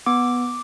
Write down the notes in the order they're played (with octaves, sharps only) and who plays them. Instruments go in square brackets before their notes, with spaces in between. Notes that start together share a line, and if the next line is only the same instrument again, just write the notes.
[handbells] B3 D6